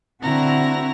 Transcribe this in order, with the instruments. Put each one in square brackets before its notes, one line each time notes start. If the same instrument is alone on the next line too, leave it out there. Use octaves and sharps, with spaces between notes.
[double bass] D3 [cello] C4 F#4 [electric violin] E4 A#5